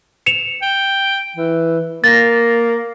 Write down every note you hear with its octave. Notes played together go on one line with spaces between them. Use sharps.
C#7 E7 F7
G5
E3
A#3 A6 A#6